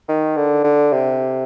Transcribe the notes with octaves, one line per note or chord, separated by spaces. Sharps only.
D#3
D3
D3
C3